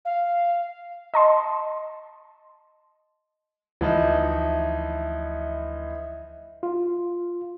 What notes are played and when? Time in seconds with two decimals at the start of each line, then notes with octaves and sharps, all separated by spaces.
0.05 F5
1.14 D#5 A5 C6
3.81 D2 E3 F3 D#4 D#5 E5
6.63 F4